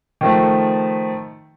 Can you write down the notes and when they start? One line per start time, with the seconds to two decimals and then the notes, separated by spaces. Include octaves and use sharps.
0.21 D#3 F3 A3